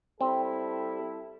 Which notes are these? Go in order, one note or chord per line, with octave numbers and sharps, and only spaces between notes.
G3 C4 E4 A4